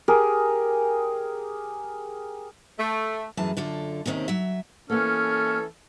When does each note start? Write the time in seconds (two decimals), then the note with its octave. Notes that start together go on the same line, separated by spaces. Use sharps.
0.08 G4 G#4 A#4
2.79 A3
3.37 F#2 A2 E3 G#4 A5
3.57 F#2 D3 F4 A4
4.06 D#2 C3 D#3 C4 C#4
4.28 F#3 E5
4.90 E3 A#3 B3 C#4 A4 F6